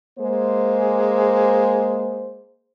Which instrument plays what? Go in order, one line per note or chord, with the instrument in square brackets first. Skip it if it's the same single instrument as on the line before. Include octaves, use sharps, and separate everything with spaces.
[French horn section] G#3 A#3 G#4 C5